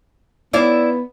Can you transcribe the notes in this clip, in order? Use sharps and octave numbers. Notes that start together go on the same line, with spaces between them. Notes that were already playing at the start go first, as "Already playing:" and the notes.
B3 E4 D5 F5